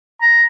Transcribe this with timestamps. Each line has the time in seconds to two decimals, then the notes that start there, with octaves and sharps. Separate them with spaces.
0.22 A#5